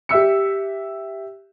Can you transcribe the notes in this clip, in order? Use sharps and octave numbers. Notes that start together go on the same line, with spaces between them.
G4 E5 E6 C#7